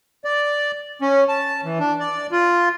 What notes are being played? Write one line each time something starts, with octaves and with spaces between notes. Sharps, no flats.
D5
C#4
A5
E3
D4
D5
F4